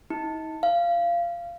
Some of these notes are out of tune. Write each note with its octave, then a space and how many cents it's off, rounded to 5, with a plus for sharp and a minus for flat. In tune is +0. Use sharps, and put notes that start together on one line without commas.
D#4 +40
F5 -20